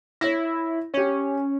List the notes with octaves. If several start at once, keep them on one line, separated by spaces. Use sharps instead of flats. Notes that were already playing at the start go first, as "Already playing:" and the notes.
E4 C#5 A#6
C#4 G4 C#5